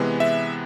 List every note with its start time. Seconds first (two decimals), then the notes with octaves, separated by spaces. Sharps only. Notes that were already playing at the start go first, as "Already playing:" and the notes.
Already playing: C3 E3 G#3 B3
0.20 E5